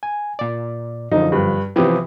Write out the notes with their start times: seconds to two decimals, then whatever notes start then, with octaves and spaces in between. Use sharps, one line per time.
0.03 G#5
0.39 A#2 D5
1.12 F#2 D3 F3 D#4
1.32 G2
1.76 C3 E3 F3 G4 D#6